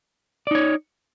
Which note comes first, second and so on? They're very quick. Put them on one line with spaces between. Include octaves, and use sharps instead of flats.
D5 D#4 C#5